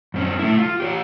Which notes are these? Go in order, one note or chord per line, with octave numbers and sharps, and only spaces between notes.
F#2 C4 C#4
A3 E4
F4
G4 C5 C#5